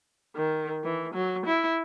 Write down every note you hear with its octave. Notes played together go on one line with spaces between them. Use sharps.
D#3
E3
F#3
E4